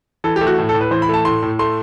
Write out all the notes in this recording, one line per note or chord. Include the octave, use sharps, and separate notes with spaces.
E3 A4
G4
A3
F#4
A2
A4
A2
B4
E3 C5
B5
A3 A5
A2 C6
A2
A3 C6